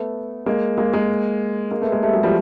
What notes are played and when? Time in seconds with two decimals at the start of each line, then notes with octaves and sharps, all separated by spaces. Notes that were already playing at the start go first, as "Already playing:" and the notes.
Already playing: A3 B3
0.46 G#3 A#3
0.78 G#3 A#3
0.93 G#3 A#3
1.71 G#3 A#3
1.82 A3 B3
1.92 G#3 A#3
2.03 G3 A3
2.13 F#3 G#3
2.23 F3 G3